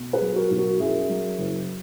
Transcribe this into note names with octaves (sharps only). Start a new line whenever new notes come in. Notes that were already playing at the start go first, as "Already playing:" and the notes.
Already playing: B2
G#4 B4
F#3
F#4 A#4
B1
F#4 A#4
F#2 E4 G#4
F#3
F#1